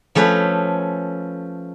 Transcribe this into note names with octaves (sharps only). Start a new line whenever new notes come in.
F3 A3 C#4 B4